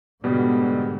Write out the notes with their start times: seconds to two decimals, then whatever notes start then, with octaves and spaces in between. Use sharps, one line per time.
0.24 G#2 B2 D3 G3 B3